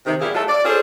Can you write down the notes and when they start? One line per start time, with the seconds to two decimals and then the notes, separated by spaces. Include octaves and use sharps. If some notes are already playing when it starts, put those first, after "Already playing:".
0.06 C3 D#3
0.20 E2 A#2 G3 E4 G#4 F5
0.35 F#3 G#3 A3 F4 A4
0.49 D5
0.65 C#4 F4 G#4 A4 C5